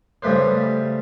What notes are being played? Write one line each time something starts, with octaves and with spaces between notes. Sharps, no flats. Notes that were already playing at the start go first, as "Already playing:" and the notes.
C#3 G3 A3 B4 C5